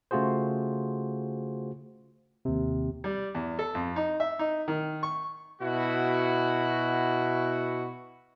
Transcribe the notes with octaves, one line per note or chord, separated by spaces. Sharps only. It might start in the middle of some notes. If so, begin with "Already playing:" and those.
C#3 A3 F4 F#4 G#4 C5
D#2 C3
G3
E2
A4
F2
D#4
E5
D#4
D#3
C#6
B2 E4 F#4